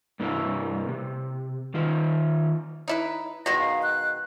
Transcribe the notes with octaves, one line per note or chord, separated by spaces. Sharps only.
G2 C3 A#3 E4
C3
D#3 F4
D#4 E4 B4
B2 D#3 G#3 A#6
F5
F#6